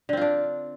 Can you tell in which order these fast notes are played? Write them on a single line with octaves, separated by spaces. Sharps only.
D3 C4 F4 D4